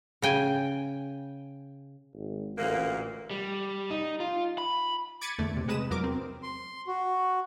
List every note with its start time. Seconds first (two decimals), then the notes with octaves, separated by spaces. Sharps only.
0.22 C#3 G5 G#5
2.15 G#1
2.58 A1 D2 A#2 A#3
3.31 G3
3.90 D#4
4.20 F4
4.58 B5
5.21 D6 G#6 A6 B6 C#7 D#7
5.39 E2 D3 A3 D5
5.56 C3
5.68 C3 G#3 B4 D#6 E7
5.90 E2 F#3 A#4 D6
6.04 C4
6.43 C6
6.87 F#4